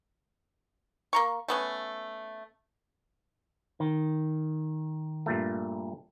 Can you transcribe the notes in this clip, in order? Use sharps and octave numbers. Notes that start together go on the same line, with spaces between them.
A#3 A#5 C#6
A3 B3 C#4
D#3
G2 A#2 A3